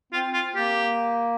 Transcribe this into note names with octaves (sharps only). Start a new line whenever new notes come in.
C4 F4
F4
A#3 G4